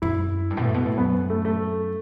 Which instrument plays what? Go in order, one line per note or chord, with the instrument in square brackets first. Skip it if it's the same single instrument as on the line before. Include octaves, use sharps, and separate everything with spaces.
[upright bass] F#2 [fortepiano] E4
[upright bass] G2
B2
A2
B2
A2
[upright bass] F#2 [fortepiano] B3
[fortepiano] A3
A3